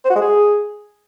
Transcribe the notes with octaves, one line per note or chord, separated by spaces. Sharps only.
C5
F#4
G#3
G#4